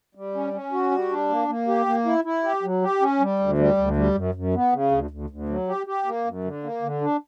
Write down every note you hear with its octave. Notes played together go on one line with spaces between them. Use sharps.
G3
C#4
C#4
F#4
G3
D4
A#3
A#3
G4
A#3
E4
E4
G4
F#3
G4
C#4
G3
D2
G3
D2
G3
F#2
F#2
B3
C#3
D2
D2
D2
F#3
G4
G4
A#3
F#2
D3
A#3
D3
D4